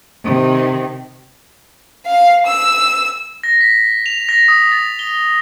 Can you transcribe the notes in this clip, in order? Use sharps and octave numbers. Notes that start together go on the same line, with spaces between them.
C3 D#3
F5
E6
A#6
B6
F7
A#6
D#6
A6
G7